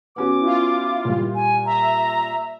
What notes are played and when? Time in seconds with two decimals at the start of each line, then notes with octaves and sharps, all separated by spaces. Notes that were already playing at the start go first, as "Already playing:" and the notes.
0.16 B3 C#4 F#4 D6
0.41 E4 F4
1.05 A#2 G3
1.35 G#5
1.66 E5 A#5